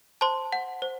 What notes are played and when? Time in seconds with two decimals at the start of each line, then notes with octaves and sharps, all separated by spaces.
0.21 C5 A5 C6
0.52 F#5
0.82 C5